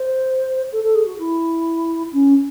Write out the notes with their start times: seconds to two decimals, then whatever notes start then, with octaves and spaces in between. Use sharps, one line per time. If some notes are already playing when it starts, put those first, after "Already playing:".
Already playing: C5
0.72 A4
0.84 A4
0.95 G#4
1.06 F#4
1.19 E4
2.13 C#4